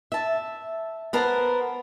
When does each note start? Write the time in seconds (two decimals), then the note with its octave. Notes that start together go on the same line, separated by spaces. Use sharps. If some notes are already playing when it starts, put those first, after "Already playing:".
0.12 E5 A5
1.13 B3 A#4 C5 A5 A#5